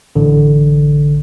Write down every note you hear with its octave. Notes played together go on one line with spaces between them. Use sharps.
A1 D3